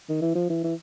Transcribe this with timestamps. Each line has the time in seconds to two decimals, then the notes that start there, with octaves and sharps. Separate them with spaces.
0.09 D#3
0.22 E3
0.35 F3
0.50 E3
0.64 E3